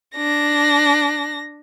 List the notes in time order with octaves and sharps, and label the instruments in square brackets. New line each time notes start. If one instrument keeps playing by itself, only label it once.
[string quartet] D4 A#6